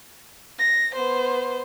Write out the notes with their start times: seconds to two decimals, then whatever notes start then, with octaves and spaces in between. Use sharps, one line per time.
0.59 A#6
0.95 B3 C5